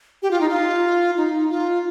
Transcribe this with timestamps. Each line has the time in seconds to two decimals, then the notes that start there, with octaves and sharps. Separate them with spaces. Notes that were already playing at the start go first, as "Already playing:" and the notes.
0.22 G4
0.31 F4
0.41 D#4
0.49 F4
1.17 D#4
1.50 F4